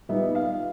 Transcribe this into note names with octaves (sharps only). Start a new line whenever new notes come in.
A#2 G3 B3 D#4 E5
F5